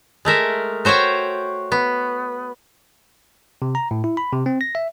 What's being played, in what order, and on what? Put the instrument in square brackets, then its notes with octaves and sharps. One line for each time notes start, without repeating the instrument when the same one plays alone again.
[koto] G#3 A3 A#4 E5
F#4 C5 C#5 E5 G5
B3
[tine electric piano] C3
A#5
A2
E4
B5
C3
C4
A#6
E5